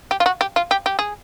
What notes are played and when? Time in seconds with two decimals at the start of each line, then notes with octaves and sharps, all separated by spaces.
0.11 G4
0.20 F4
0.26 F#4
0.41 G4
0.56 F4
0.71 G4
0.86 G4
0.99 G#4